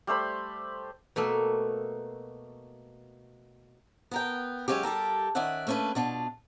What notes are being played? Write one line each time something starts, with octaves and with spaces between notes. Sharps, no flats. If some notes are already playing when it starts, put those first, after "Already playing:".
G3 A3 C5 B5
B2 A3 A#3 E5
B3 A#4 G5
F#3 G#3 C#4 F4 G4
G3 G4 A4 A#4
D#3 C#4 D5 E5 F#5
A3 A#3 C#4 D4 B4
B2 D4 F4